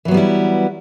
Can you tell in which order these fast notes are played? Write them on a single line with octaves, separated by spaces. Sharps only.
E3 F#3 B3 G3 E4